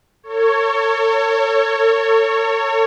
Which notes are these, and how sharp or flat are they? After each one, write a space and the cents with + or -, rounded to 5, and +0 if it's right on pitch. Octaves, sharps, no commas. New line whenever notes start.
A4 +40 C#5 +0